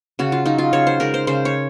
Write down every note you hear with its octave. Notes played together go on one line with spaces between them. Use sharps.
C#3 F#4
F4
F#3 D#4
F4
C#3 C#5
C5
G#3 A#4
C5
C#3 C5
C#5